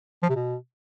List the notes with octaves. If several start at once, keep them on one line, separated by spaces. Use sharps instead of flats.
F3
C3
B2